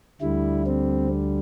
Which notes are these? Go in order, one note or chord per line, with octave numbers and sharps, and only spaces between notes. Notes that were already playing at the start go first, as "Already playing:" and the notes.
D2 D3 G3 E4
C4